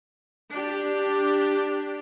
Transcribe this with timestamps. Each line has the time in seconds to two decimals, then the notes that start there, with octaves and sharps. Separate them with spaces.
0.53 D4 G4